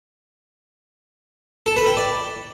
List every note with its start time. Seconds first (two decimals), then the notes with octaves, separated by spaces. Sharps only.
1.66 A4
1.76 B4
1.87 G5
1.97 D5